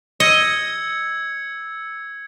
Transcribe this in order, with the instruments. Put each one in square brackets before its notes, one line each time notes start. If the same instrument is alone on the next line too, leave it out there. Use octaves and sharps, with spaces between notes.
[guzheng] D#5 [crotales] E6 G#6 C#7